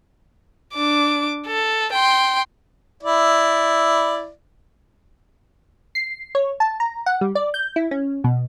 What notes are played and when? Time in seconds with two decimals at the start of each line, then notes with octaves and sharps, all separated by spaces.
0.75 D4 D6
1.47 A4
1.92 G5 C6
3.03 E4 D5
5.95 C7
6.35 C#5
6.60 A5
6.80 A#5
7.06 F#5
7.21 G3
7.35 D5
7.54 G6
7.76 E4
7.91 C#4
8.24 B2